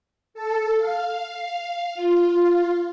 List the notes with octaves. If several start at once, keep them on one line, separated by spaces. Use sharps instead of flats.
A4
F5
F4